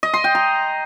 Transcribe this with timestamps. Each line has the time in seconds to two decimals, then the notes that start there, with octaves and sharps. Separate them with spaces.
0.03 D#5
0.14 C6
0.24 G5
0.35 A#5